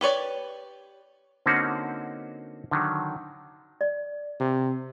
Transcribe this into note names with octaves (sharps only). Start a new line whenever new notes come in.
G4 B4 C#5 D5
D3 A#3 C4 C#4 D#4 F#4
D3 D#3 F#3
D5
C3